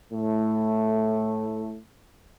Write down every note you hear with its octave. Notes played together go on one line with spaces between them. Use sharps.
A2 A3